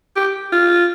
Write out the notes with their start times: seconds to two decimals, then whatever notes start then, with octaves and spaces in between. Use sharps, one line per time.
0.16 G4
0.52 F4